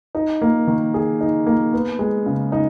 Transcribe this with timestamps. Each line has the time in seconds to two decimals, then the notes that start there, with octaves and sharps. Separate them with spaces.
0.15 D#4
0.42 A#3
0.67 D#3
0.94 G#4
1.21 D#4
1.47 A#3
1.73 B3
1.99 G#3
2.26 C#3
2.52 D#4